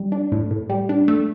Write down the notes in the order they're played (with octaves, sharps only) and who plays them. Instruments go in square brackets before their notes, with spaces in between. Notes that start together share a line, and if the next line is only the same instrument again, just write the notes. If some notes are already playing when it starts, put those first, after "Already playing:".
Already playing: [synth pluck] G3
D4
A2
A2
G3
D4
A3